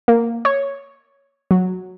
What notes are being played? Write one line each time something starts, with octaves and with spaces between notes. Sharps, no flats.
A#3
C#5
F#3